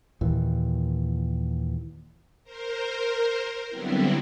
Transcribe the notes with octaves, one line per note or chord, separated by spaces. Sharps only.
D#2 A#2 E3
A#4 C5
D3 F#3 G3 B3 C4 E4